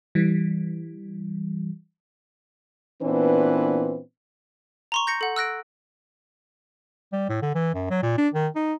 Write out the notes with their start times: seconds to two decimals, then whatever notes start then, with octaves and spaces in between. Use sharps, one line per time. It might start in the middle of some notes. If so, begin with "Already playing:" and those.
0.15 E3 G3
3.03 A#2 E3 B3 C4 D4 B4
4.92 A#5 C6 C#6
5.07 G6 A#6 C#7
5.21 A4 F#5
5.36 E6 F#6 A#6 D7
7.13 G3
7.29 A2
7.42 D3
7.55 E3
7.74 F#2
7.90 F#3
8.03 A#2
8.18 D4
8.34 D#3
8.56 D#4